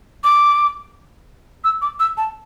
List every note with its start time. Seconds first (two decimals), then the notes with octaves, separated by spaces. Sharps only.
0.24 D6
1.64 E6
1.82 D6
2.00 E6
2.17 A5